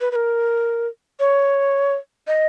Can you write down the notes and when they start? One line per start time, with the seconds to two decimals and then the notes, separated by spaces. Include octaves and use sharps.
0.01 B4
0.11 B4
0.16 A#4
1.20 C#5
2.27 D#5